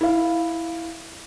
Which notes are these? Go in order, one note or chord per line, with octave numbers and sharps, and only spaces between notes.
E4 F5